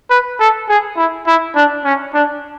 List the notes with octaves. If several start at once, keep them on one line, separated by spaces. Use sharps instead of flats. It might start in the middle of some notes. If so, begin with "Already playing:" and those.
B4
A4
G#4
E4
E4
D4
C#4
D4